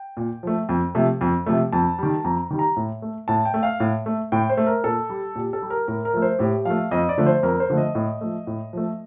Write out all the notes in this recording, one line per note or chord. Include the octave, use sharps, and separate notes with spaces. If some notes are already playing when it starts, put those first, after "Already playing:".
Already playing: G5
A#2
F3 A3
F2
C3 F3 A3
F2
C3 F3 A3
F2 A5
D#3 G3
F2 A#5
D#3 G3
A#5
A2
A3
A2 A5
G5
A3
F5
A2
A3
A2 G5
C5
A3
A#4
A#2 A4
G3
A#2 G4
A4
G3
A#4
A2 A#4
A#4
F3 A3
C5
A2 G4
F3 A3 F5
F2 D#5
D5
D3 F3 A3
C5
F2 A#4
C5
D3 F3 A3
D#5
A2
F3 A3
A2
F3 A3